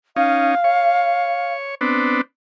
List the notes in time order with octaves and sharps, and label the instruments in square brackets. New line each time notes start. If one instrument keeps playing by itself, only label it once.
[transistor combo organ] C#4 D#4 [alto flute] F5
[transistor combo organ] C#5
B3 C4 D4